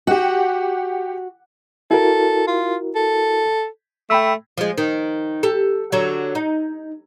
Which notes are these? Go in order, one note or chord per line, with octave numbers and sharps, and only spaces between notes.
F#4 G4 F#5
E4 F#4 A4 A#4
F4
A4
A3 G5 B5 E6
F3 G#3
D#3
G4 A4
D3 F#3
D#4